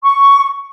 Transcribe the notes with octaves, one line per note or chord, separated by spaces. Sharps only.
C#6